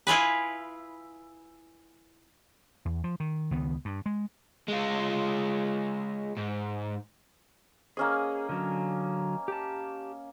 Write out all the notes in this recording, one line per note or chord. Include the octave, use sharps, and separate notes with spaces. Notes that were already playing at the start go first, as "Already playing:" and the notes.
E4 F4 G#4 B4
E2
F3
D#3
C#2 D#3 B3
G2
G#3
G#3 F4
G#2
A#3 C#4 G#4 D#5
D3 F#3
G4 A5